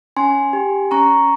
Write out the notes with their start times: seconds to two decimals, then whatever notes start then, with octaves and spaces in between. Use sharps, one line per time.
0.17 C#4 G#5 C6
0.53 G4
0.91 C#4 A#5 C#6